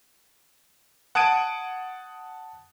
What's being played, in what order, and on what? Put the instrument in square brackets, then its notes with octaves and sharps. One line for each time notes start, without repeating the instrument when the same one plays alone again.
[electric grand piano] F#5 A5 D#6 G#6 D7 D#7